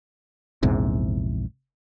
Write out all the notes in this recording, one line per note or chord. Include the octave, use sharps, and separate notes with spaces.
A#1 E2 G#2 C3